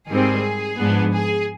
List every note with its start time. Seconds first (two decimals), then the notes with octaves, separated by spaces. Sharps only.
0.10 G#2 D#3 G3 C4 G#4
0.79 G#2 F3 B3 D4
1.14 G#4